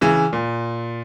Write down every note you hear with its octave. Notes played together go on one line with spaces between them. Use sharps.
C#3 E3
A#2